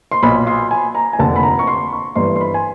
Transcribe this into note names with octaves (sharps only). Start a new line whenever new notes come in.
C6
B1 A#2 B5
C6
G#5
A#5
G#5
F1 D#2 D3 A5
B5
A#5
C#6
C6
C#6
G1 G2 E3 C6
C6
B5
G#5